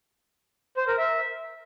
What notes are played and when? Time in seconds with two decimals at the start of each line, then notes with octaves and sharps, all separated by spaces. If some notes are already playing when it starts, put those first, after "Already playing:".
0.77 C5
0.87 A#4
0.98 E5